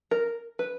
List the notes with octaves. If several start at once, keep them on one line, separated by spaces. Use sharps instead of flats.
A#4
B4